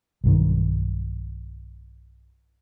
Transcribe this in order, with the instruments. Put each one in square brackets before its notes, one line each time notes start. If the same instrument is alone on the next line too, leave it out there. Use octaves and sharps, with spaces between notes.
[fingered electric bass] B1 G2 D#3